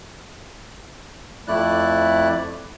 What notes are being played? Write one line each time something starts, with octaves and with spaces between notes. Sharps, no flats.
F2 A3 E4 D5 F#6